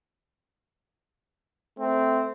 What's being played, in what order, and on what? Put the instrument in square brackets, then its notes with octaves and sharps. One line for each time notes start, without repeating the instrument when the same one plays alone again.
[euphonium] A3 [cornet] C4